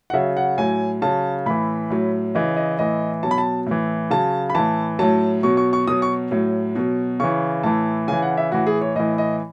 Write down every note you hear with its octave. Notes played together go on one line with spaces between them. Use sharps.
F#5
C#3 F#3 E5
F#5
A2 F#3 G#5
C#3 F#3 A5
A2 E3 B5
A2 F#3
C#3 E3 D#5
D#5
A2 E3 D#5
B2 F#3 A5
B5
A5
A2 E3
C#3 F#3 A5
B5
A2 E3 A5
A2 F#3 A5
B2 F#3 C#6
C#6
C#6
B2 F#3 D#6
C#6
A2 F#3
B2 F#3
C#3 E3 C#6
A2 E3 A5
C#3 E3 G#5
F#5
E5
A2 E3 F#4
G#4
C#5
A2 E3 D#5
D#5